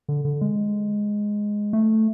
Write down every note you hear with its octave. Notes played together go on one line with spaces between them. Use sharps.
D3
D3
G#3
A3